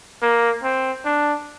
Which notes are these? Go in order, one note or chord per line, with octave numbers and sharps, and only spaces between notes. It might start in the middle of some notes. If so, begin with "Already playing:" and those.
A#3
C4
D4